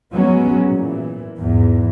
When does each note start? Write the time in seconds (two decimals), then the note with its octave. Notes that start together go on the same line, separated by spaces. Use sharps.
0.14 F#3 G#3 B3 C#4
0.69 A#2 E3
1.39 E2 G#2